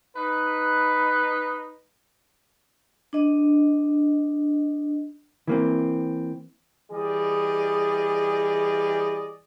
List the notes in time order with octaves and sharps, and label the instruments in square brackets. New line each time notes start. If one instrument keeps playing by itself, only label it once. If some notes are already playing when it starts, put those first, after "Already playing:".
[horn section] D#4 B4
[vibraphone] D4 D#5
[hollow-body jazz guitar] E3 A#3 C4
[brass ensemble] E3 G3 G#4 D5 D#5